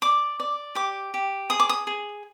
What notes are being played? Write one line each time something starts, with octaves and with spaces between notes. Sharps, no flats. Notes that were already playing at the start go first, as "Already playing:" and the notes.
D5 D6
D5
G4 D6
G4
G#4 D#6
D6
D#6
G#4